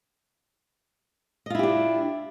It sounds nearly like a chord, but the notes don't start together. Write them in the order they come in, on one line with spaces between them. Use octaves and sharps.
D#5 F4 E4 G4 D4